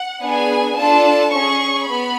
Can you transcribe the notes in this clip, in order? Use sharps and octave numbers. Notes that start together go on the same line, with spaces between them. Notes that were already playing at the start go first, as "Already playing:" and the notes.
Already playing: F#5
B3 D4 G#4 G#5
D4 F4 A4 A5
C#4 G#4 C#6
B3 B5